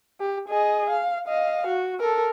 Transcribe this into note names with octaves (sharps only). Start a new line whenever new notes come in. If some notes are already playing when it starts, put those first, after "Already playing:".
G4
G#4 D#5
F5
D#5 F5
F#4
A4 A#4